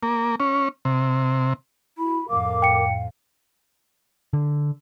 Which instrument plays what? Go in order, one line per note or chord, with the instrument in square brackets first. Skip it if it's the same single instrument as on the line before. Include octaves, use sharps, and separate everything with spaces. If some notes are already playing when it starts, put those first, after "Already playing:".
[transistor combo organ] A#3
C#4
C3
[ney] E4 [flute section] F#4 B5
[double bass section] F2 A2 [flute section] A#4 D6 [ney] F5
[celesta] G5 C#7
[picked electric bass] D3